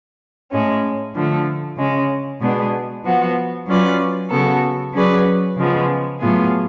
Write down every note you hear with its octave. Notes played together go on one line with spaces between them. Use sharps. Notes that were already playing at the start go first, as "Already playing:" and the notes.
A2 G#3 C#4
D3 F3 A3
C#3 G#3 C#4
B2 G#3 B3 D4 G#4
F3 B3 F#4
F#3 C#4 F4 B4 D5
C#3 F#3 B3 F#4 A4
F#3 C#4 G#4 B4 D5
C#3 F3 G#3 B3
A2 F#3 B3 F4 G#4